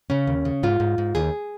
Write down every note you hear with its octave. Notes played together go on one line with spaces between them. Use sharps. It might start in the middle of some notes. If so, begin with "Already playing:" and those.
C#3 C#4
D#2
C#3
G#2 F4
G#2
G#2
D#2 G#4